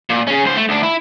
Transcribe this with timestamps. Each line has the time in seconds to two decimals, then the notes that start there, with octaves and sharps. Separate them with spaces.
0.10 A#2
0.27 C#4 G#4
0.44 C#2 C5
0.56 A3
0.69 D2 D4
0.83 E4